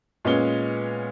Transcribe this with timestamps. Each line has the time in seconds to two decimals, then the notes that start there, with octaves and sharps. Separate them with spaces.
0.25 A#2 G#3 B3 C#4 G7